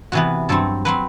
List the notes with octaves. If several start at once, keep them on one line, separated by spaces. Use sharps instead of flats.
C3 E3 B3 F#4
G2 F#3 C4 A4
F#3 C4 B4